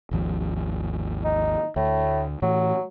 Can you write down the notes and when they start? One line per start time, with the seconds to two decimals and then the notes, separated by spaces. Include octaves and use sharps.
0.11 G#1 D#2 F3
1.25 D#4
1.76 D2 A2
2.42 A2 E3 F#3